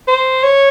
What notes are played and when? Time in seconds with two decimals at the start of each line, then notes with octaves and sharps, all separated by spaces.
0.07 C5
0.44 C#5